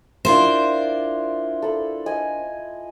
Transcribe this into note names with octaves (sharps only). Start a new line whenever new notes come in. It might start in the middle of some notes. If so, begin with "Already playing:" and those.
D4 E4 F4 A#4 C5 D5
A4 B5
D#5 G#5